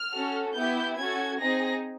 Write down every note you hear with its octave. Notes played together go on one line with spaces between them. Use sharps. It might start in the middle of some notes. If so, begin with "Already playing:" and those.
Already playing: F6
C#4 F#4 A4
B3 E4 G4 G6
C#4 F#4 A4 G#6
C4 D#4 G#4 A#6